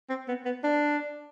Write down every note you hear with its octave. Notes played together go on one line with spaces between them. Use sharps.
C4
B3
B3
D4